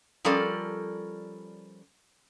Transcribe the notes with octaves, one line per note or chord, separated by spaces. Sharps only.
F3 G3 C#4 A4 A#4 D5